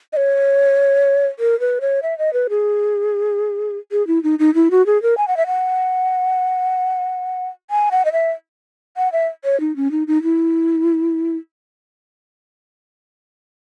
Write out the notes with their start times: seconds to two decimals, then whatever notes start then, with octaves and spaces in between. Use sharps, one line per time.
0.13 D#5
0.17 C#5
1.39 A#4
1.60 B4
1.81 C#5
2.03 E5
2.18 D#5
2.33 B4
2.50 G#4
3.92 G#4
4.07 E4
4.23 D#4
4.39 D#4
4.55 E4
4.71 F#4
4.86 G#4
5.02 A#4
5.18 G#5
5.28 F#5
5.37 E5
5.47 F#5
7.71 G#5
7.92 F#5
8.05 D#5
8.12 E5
8.97 F#5
9.12 E5
9.44 C#5
9.60 D#4
9.76 C#4
9.91 D#4
10.07 D#4
10.23 E4